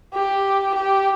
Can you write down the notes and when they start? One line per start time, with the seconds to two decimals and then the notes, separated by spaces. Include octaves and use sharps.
0.14 G4
0.75 G4